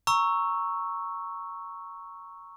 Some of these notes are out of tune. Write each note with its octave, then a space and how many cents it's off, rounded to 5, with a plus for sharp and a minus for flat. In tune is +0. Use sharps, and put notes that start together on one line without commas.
A#5 +0 C#6 +0 E6 +0